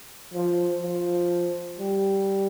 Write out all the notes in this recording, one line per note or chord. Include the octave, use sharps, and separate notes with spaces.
F3
F3
G3